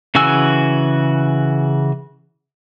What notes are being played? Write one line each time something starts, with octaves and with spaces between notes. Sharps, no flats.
C#3 E3 F#4 G#5 E6